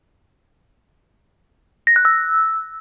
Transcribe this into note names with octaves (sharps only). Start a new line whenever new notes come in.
A#6
F#6
E6